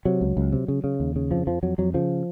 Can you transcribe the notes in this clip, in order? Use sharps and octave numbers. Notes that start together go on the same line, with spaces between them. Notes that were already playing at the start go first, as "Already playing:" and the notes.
C3 F#3
C#2
C#2
C3
C#3
C#3
D#2
C#3
F2 F3
F2 F3
F2 F#3
F2 F#3
C#3 F3